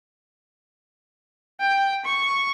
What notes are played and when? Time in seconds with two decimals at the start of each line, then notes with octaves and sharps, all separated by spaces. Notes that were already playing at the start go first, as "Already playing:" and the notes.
1.60 G5
2.05 C#6